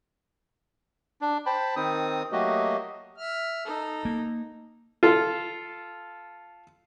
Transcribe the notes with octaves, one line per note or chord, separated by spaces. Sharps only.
D4
C5 G5 A5 B5
D#3 C4 D#4 D#6
F#3 A3 A#3 F#4 G4 D#5
E5 F6
D#4 A4
A#3
F4 A4